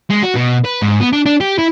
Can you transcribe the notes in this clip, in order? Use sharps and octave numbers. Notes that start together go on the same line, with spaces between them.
G#3
F#4
B2
B4
G#2
B3
D4
D4
G4
E4